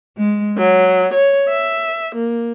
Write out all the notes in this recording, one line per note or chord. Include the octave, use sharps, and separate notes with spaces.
G#3
F#3
C#5
E5
A#3